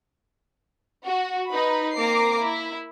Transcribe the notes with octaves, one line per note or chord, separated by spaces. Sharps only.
F#4
D#4 B4 B5
A#3 C4 A#5 D6 C7
E4